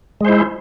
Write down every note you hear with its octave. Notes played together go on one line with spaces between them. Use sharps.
G#3 E4 C5